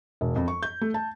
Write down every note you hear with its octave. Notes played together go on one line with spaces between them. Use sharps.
E1
F2
C#6
G6
A3
A5